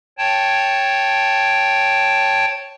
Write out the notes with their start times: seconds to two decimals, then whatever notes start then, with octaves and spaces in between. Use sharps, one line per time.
0.18 C#5 G5 A5